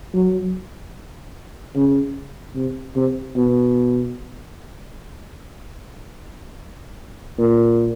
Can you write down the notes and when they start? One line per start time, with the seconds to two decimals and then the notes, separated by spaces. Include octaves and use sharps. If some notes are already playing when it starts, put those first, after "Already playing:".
0.14 F#3
1.76 C#3
2.56 C3
2.96 C3
3.36 B2
7.39 A#2